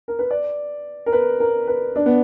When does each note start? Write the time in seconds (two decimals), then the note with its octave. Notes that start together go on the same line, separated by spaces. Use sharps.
0.08 A#4
0.19 B4
0.31 D5
1.06 A#4
1.13 B4
1.40 A#4
1.68 B4
1.96 D4
2.06 B3